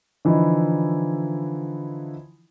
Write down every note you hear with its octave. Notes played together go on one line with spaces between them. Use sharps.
D3 E3 F3 D#4 E4